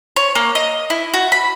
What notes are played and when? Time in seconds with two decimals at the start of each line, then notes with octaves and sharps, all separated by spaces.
0.16 C#5
0.35 A#3
0.55 D#5
0.90 E4
1.14 F#4
1.32 B5